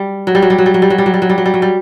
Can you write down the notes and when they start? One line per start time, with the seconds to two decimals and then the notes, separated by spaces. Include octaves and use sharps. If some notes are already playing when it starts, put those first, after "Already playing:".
Already playing: G3
0.27 F#3
0.35 G3
0.42 F#3
0.50 G3
0.58 F#3
0.66 G3
0.74 F#3
0.82 G3
0.90 F#3
0.98 G3
1.06 F#3
1.14 G3
1.22 F#3
1.29 G3
1.38 F#3
1.46 G3
1.54 F#3
1.62 G3